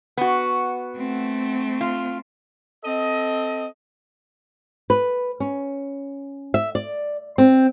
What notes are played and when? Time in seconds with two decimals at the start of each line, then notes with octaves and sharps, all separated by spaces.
0.17 B3 F#4
0.96 A3 C4
1.81 F4
2.84 C4 A4 D#5
4.90 B4
5.40 C#4
6.54 E5
6.75 D5
7.38 C4